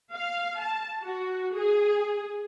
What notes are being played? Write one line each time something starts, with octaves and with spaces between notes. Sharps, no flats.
F5
A5
F#4
G#4